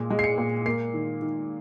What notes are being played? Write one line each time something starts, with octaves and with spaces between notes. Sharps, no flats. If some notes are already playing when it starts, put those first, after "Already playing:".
Already playing: A#2 G#3
G#3
C7
C#7
A#2
A#3 C7
D#3
D#3